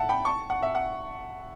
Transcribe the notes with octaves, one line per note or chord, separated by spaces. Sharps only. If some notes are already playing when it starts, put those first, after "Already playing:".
Already playing: E5 F#5 A5
G5 B5
A5 C#6
F#5
E5
F#5